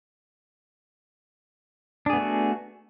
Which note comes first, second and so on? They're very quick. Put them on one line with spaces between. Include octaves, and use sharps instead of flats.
D4 G#4 B3 A3 F#4